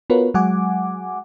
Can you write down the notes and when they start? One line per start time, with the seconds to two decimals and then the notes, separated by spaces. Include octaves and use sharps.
0.10 B3 F4 F#4 A#4 B4 C#5
0.34 F#3 G#3 F#5 G#5 D6